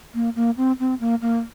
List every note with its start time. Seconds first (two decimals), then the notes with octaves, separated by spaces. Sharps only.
0.15 A#3
0.36 A#3
0.57 C4
0.80 C4
1.00 A#3
1.21 A#3